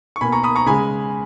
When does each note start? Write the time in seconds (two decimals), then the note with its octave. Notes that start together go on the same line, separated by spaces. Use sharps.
0.16 C#6
0.21 B2 A#3 G#5 B5
0.32 A#5 C#6
0.43 B5 D#6
0.56 A#5 C#6
0.66 C#3 G#3 G#5 B5